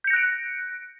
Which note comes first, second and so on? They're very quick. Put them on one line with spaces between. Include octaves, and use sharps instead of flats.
G6 C#7 A#6 F#6 D7